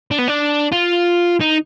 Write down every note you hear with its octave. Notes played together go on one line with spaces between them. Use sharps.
D4
B3
D4
F4
D#4